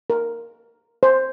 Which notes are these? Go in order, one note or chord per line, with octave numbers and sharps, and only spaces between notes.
A#4
C5